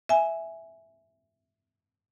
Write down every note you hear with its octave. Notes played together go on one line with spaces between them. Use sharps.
E5 G#5